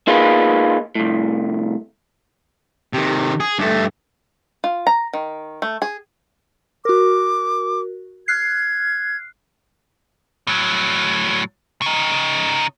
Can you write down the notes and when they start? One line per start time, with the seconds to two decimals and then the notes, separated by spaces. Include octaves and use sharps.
0.07 A#3 D#4 F4 G#4 B4
0.95 C2 A2
2.93 C3 D#3
3.40 G#4
3.59 G2 A3
4.64 F4
4.87 A#5
5.13 D#3
5.62 A3
5.82 G#4
6.85 F#4 A#4 D6
8.28 F6 F#6 G#6 C7
10.47 A2 F#3
11.82 C#3 D#4